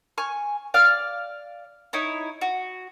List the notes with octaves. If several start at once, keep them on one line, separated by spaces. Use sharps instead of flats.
G#5 C#6 F6
D5 F5 F6
D#4 E4 C#5
F#4